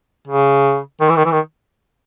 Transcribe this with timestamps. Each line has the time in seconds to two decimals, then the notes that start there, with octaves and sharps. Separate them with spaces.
0.27 C#3
1.01 D#3
1.09 E3
1.16 D#3
1.25 E3
1.32 D#3